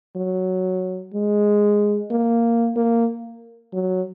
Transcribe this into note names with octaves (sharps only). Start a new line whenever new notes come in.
F#3
G#3
A#3
A#3
F#3